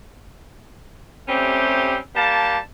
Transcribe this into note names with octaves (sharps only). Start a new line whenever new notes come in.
G3 A3 C4 C#4 G4
G3 A#3 A5